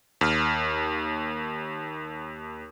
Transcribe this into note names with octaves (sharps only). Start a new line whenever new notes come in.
D#2 F6